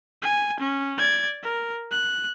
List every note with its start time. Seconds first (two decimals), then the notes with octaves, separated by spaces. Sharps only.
0.22 G#5
0.60 C#4
0.98 D5 G#6
1.43 A#4
1.91 F#6